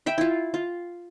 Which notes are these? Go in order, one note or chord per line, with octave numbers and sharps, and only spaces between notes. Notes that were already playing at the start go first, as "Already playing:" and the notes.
E5 G5 B5
E4 F4
F4